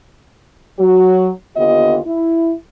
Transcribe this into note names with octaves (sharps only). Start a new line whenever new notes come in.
F#3 F#4
D#2 D3 B3 F4 G4 D#5
E4